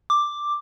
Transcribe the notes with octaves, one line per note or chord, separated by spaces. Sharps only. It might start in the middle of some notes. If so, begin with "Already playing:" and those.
D6